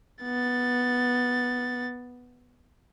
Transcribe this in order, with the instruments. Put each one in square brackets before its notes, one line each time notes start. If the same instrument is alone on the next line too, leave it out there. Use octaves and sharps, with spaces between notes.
[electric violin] B3 A6